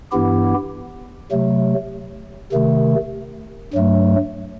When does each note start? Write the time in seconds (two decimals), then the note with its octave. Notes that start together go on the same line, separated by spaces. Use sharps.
0.11 G2 E3 B3 E4 G4
1.32 C3 F#3 A3
2.53 C3 D#3 A3
3.73 G2 F#3 A3